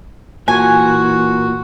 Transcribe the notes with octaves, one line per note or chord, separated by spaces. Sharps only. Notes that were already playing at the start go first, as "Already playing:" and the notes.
A#2 E3 F#4 G#5